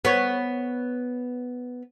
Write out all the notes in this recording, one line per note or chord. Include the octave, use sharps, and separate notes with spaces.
B3 C#5